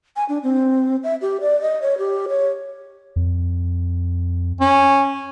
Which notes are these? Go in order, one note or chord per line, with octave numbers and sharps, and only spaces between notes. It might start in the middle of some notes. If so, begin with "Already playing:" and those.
G#5
D4
C4
E5
G4
D5
D#5
C#5
G4
C#5
F2
C#4